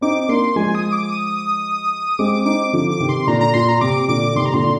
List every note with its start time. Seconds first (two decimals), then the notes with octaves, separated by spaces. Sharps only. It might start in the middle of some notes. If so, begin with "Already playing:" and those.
0.01 C4 D#4 D6
0.29 A#3 D4 C6
0.56 F3 G#3 G#5
0.75 D#6
0.92 D6
1.10 D#6
2.19 G#3 C4 D6
2.45 C4 D#4 D6
2.73 D3 F3 D6
2.91 D6
3.00 C3 D#3
3.09 C6
3.27 A#2 D3 A#5
3.41 A#5
3.54 A#2 C6
3.69 A#5
3.81 C3 D6
4.08 A#2 D3 D6
4.35 C3 D#3 C6
4.46 A#5
4.54 A#2 D3 C6